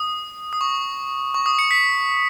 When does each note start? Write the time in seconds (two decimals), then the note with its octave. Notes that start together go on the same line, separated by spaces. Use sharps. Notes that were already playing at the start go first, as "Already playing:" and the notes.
Already playing: D#6
0.53 D#6
0.61 C#6
1.34 C#6
1.46 D#6
1.59 C#7
1.71 B6